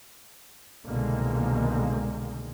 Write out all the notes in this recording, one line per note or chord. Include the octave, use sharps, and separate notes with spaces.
C2 B2 D3 D#3 G#3 A#3